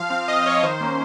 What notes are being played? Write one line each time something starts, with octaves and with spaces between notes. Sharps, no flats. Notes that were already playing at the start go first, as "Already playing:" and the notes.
Already playing: F3 F5
C4 F5
F3 D#5
C4 C#5
D#3 C5
A#3 C#4